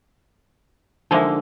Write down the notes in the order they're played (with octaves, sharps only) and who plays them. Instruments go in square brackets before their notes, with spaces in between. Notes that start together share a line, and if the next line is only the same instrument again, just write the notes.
[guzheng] D3 [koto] F3 G#3 A#3 [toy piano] D#4 E5